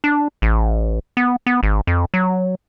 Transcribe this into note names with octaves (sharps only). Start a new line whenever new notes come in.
D4
A1
B3
B3
G#1
F2
F#3